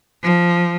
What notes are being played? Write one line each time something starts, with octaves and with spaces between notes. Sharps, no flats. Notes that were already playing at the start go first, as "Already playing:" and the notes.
F3